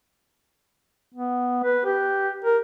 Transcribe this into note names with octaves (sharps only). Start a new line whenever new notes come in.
B3
B4
G4
A#4